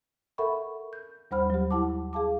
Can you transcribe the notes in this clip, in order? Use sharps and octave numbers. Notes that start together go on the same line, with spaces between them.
A4 A#4 E5 F#5 B5 C#6
G6
D#2 G3 C5 F#5 B5 F6
F#3 G4
E4 F#5 A5 D6
G#4 F5 A5 D6